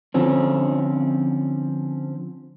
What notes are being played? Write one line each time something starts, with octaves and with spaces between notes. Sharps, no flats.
D3 F3 C4 C#4